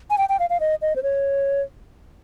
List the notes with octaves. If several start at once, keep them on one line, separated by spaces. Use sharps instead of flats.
G#5
G5
G5
F5
F5
D#5
D#5
C5
C#5